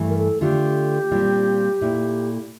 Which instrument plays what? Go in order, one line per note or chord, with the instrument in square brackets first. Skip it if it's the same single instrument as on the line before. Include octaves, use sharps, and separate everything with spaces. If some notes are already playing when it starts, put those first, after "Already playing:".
Already playing: [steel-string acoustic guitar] G2 E3 A3
[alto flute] A#4
A4
[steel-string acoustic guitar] D3 A3 D4 F4 [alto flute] G4
[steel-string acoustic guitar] A#2 G3 C4 F4
A#2 A3 E4